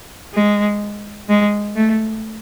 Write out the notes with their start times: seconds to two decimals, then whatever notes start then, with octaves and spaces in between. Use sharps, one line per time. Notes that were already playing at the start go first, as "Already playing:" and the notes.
0.34 G#3
1.29 G#3
1.76 A3